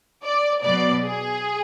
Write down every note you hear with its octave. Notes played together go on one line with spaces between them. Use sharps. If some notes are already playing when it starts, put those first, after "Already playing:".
D5
B2 F#3 B3 D5
G#4